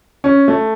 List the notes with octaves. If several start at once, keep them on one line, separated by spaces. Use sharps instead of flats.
C#4
A3